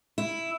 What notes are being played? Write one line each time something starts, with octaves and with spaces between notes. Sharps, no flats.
E4